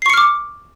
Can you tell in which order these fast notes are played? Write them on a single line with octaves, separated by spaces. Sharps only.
C7 C#6 C#7 F6 D6